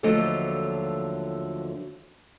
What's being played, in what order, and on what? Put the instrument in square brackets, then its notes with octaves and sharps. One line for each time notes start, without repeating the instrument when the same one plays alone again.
[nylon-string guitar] D#2 D3 F3 F#3 A3 D#5